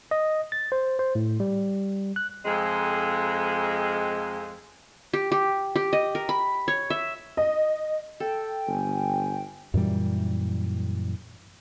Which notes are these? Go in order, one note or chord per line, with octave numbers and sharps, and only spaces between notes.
D#5
A6
C5
C5
A2
G3
F#6
F2 G#3
G4
G4
G4
D#5
A#4
B5
C#5
E5
D#5
A4 G5
G1 G#5
F#2 A#2 E3 G3